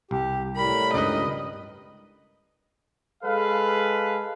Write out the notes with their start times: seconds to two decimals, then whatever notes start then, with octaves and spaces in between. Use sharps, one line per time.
0.11 C2 G4
0.57 A2 G3 A#4 B5
0.94 C#2 G2 B4 D#5
3.23 G#3 A4 B4 F5